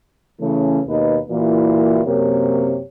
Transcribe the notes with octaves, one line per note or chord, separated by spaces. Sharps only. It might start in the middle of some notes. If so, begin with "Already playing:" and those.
C#3 E3 A3 C#4
D#2 B2 D#4 B4
A#2 E3 A#3 E4 F#4
F#2 C3 A#3 G4 C#5